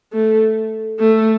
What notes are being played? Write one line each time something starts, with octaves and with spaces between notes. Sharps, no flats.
A3
A3